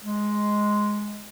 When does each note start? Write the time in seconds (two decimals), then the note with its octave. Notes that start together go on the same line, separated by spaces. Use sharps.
0.03 G#3